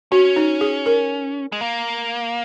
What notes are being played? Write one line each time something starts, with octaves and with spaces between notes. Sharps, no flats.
C#4 F#4
D#4
G#4
A#4
G#3
A#3